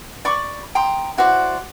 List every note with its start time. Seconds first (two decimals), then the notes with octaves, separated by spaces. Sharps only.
0.25 D5 B5 C#6 D6
0.75 G5 A#5 C6 D#6
1.17 E4 F#4 C5 D5